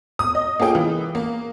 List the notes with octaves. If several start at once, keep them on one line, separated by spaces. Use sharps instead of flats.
D#6
D#5
A#3 F4 G#4 G5
E3 G#3
A#3